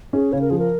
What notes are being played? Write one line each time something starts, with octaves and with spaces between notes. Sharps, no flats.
C#4 G#4
C#3 C#5
A#4
F3 G#4
A#4